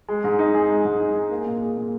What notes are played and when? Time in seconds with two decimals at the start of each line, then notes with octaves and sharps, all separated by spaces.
0.09 G#3
0.24 G#2
0.39 D#4
0.54 G#4
0.69 G#3
0.85 G#2
1.00 D#4
1.15 G#4
1.31 A#3
1.46 A#2
1.62 G#4
1.77 A#2